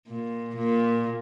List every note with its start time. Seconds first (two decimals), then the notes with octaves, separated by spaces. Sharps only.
0.08 A#2
0.56 A#2